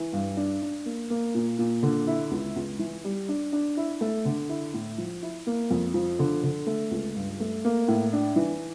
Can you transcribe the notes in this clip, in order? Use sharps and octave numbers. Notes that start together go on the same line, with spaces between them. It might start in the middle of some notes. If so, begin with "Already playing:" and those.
Already playing: E3
G2
D4
D4
A#3
A#3
A#2
A#2
D3
E4
C#2
C#2
E3
G3
D4
D4
E4
A3
D3
E4
A2
F3
E4
A#3
F2
F3
D3
D3
A3
C#2
G2
A3
A#3
A2
D4
E3